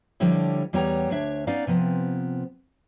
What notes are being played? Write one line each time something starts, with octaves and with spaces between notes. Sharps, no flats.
D3 F3 G3 E4 A4 C#5
E2 G3 B3 C#5 G5 A#5
D2 D4 C#5 E5
B3 C#4 D#4 D5 F5
C3 F3 B3 C4